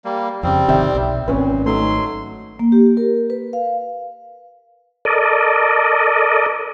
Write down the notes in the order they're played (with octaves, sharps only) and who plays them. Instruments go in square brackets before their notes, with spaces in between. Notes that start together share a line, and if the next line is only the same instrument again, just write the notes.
[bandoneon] G3 A#3
[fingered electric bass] F2 C#3 [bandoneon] G3 C4
[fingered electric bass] G#1 C3 D#3 [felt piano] D5 E5 G5
[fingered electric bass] B1
[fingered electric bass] G#1 [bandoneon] A#2 [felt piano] C4 C#4 B4
[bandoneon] F#3 C6 [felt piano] A3 D#4
[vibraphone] A#3
G4
A#4
B4
F5
[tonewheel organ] A4 A#4 D5 D#5